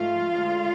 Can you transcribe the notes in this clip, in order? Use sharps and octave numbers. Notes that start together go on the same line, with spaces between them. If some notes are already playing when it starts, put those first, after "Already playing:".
Already playing: G#2 F3 A3 F4 F5
D2 D3 G#3